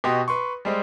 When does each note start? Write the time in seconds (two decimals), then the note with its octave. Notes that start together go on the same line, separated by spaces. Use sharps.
0.04 B2 F#4 G4 D#5 C6
0.28 B4 C6 C#6
0.65 G3 G#3 C5 D5